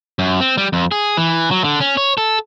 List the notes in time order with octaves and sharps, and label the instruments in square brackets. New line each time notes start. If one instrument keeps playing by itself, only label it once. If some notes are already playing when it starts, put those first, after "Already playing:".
[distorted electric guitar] F#2
C4
G3
F2
G#4
E3
F#3
D3
C#4
C#5
A4